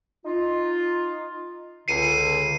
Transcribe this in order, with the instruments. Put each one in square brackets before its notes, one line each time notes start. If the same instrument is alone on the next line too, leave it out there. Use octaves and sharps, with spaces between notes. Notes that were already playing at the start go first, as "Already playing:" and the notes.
[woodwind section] D#4 F4
[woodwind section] C#2 D3 [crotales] C7 C#7 D#7